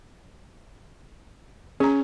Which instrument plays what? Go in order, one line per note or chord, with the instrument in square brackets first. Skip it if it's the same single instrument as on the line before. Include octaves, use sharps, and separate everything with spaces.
[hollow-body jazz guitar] C#4 [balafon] G#4 A#5